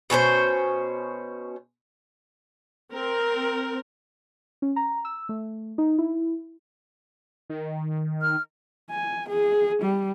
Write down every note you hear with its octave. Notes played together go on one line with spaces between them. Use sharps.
B2 C#4 D#4 C5
C4 A#4
C#4
A#5
E6
A3
D#4
E4
D#3
F6
G#5
G#4
G3